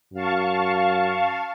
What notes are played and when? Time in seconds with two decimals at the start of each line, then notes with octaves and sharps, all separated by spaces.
0.14 F#2 F5 A5 C#6